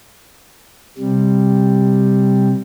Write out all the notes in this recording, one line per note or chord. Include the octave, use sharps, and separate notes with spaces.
C3 G3